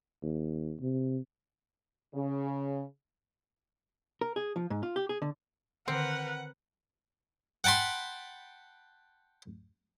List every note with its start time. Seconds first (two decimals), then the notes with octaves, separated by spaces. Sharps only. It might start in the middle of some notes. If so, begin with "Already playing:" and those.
0.23 D#2
0.80 C3
2.15 C#3
4.21 A#4
4.36 G#4
4.56 F3
4.70 G#2
4.83 F4
4.96 G4
5.09 G#4
5.22 D3
5.88 D3 D#3 C4 A#4 B4 F#5
7.64 F#5 G5 A5 B5 C6